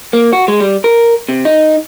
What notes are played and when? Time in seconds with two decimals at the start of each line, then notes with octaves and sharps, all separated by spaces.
0.13 A#3
0.33 F#4
0.48 G#3
0.60 G3
0.84 A#4
1.29 C3
1.45 D#4